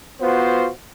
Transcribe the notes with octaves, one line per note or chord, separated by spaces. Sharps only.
B3 F4 F#4 C5